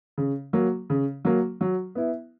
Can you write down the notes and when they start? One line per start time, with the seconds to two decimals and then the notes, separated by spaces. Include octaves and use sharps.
0.18 C#3
0.53 F#3 A#3
0.90 C#3
1.25 F#3 A#3
1.61 F#3
1.95 B3 E4